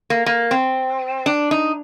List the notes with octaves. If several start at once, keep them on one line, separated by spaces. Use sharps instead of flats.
A#3
A#3
C4
D4
D#4